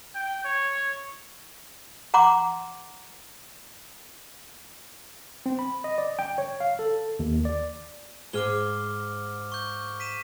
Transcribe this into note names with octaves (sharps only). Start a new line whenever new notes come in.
G5
C#5
F#5 A#5 C6 D6
C4
B5
D#5
D5
G5
C#5
F5
A4
D#2
D5
G#2 G#4 D6 F6 G7
C#6 G6
B6 D#7 E7